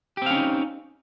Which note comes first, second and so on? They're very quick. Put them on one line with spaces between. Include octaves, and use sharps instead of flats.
G4 C4 F5 C#4 D#4